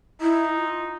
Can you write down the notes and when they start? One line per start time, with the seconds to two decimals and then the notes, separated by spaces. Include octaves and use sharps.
0.21 D#4 E4
0.56 F4